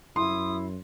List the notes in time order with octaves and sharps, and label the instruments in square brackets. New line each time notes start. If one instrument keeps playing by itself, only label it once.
[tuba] F#2 [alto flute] E4 [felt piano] C6 [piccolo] D#6